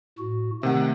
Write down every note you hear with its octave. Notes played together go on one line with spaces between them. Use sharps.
A2 F#4
C3 D#3 A3 F#5